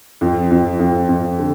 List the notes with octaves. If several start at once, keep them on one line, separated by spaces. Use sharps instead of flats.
F2
F2
F2
F2
D3